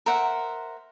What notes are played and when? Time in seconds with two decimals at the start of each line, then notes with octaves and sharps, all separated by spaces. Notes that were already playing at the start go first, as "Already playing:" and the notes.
0.06 A#4 C5 E5 F#5